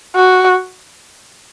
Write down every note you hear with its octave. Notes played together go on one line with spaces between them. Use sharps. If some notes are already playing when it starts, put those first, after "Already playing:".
F#4